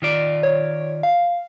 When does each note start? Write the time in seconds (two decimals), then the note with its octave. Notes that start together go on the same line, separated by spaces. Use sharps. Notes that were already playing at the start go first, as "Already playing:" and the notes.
0.02 D#3 F4 D5
0.43 C#5
1.03 F5